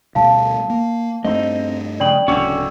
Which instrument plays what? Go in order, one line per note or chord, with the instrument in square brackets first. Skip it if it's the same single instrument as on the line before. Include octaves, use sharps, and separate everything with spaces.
[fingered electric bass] D2 B2 G3 [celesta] F5 A5
[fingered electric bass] A#3
[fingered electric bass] G2 A3 [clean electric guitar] C4 D#4 [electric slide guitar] D#5
[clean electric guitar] F2 C#3 [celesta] D5 G5 F#7
[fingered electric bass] D1 [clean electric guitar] C#2 D3 F#4 [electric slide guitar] C#4